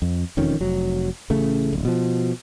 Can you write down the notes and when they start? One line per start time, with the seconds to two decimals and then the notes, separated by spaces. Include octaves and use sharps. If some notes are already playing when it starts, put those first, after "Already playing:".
0.02 F2
0.37 E1 F2 D#3 C#4
0.60 F1 F#3
1.30 A1 C#3 A3
1.73 D1 A#1
1.85 B2 F3